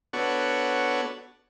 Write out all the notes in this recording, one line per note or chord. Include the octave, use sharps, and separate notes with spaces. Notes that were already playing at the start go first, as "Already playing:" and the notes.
B3 D4 F#4 A4 C#5